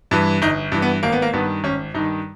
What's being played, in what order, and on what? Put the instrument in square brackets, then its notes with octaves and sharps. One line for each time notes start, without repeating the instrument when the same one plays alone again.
[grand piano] G2 E3
G1 D#4
G2 E3
B3
G#1 A#3
B3
A#3
G2 D#3 B3
G#1 C#4
G2 D#3 D#4